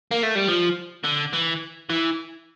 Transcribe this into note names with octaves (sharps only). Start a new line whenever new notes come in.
A#3
A3
G3
F3
D3
E3
E3